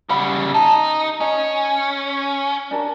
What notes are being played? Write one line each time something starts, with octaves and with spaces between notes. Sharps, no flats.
C#3 G3 F#5 B5
D#4 A5 A#5
C#4 D#5
D4 A#4 A5